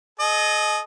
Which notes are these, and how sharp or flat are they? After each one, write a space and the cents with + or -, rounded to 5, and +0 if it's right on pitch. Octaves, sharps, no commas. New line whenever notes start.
G#4 +45 D#5 -10